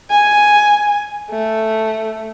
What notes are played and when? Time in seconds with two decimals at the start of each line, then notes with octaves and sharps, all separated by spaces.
0.10 G#5
1.31 A3